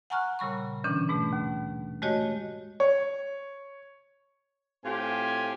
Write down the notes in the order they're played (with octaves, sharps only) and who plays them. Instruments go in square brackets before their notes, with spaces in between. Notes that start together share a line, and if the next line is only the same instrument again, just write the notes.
[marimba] F#5 G#5 A#5 C#6 F6 F#6
A#2 C#3 G3 B5 C#6
B2 D3 E3 C#4 D4
G#2 B2 A3
D#2
G#3 A3 F#4 G4 C#5 D#5
[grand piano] C#5
[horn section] A2 C4 F4 G4 G#5